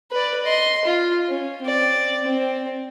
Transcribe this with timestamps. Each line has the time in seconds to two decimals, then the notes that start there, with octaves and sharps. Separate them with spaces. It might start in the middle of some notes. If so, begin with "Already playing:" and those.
0.11 B4 D5
0.43 D#5 C6
0.85 F4
1.28 C#4
1.62 C4 D5
2.23 C4